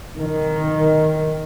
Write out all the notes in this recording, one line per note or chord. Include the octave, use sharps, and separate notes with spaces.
D#3